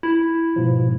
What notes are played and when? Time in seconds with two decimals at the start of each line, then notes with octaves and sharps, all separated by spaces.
0.03 E4
0.56 G#2 B2 F3